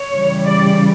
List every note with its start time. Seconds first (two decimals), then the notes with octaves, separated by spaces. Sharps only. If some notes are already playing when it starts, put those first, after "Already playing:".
Already playing: C#5
0.13 C#3 E3 G3
0.45 D5